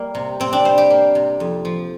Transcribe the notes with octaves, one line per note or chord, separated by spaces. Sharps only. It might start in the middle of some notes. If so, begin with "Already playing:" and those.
Already playing: G3 A#3
C3
C3 C4
D4
G3 C5
G4
A#3
C3
F2
F3